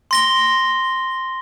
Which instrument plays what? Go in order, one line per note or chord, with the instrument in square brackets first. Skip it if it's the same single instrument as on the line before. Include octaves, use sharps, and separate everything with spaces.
[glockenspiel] C6 A#6 G7